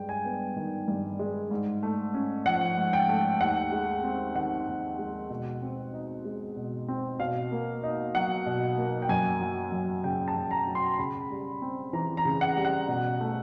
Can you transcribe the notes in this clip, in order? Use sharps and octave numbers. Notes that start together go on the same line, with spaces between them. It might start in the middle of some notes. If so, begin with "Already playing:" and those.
Already playing: G2 G#3 G5
G#5
B3
D#3
G2
G#3
G#2
A3
C#4
F3 F#5
G#2
G5
A3
D#2 F#5
G#3
C4
D#3 F#5
D#2
G#3
B2
C4
D#4
G#3
B2
C4
B2 F5
A#3
D#4
F#3 F#5
B2
A#3
G5
F#2 G#5
F#3
F#2
C#3 G5
A5
F#2
A#5
F#3
C6
C#3 B5
G3
C4
E3 A#5
A#5
C#3
F#5
G3
F#5
B2
A3